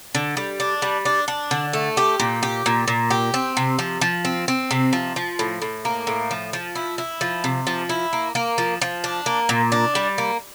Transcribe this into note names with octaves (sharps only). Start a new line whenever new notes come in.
D3
G3
D4
G3
D4
D4
D3
A3
G4
A#2
G4
A#2
A#2
G4
C4
C3
F3
F3
C4
C4
C3
F3
F3
A2
A2
A#3
A2
F3
F3
E4
E4
F3
C3
F3
E4
A#3
A#3
F3
F3
D4
A#3
A#2
D4
G3
A#3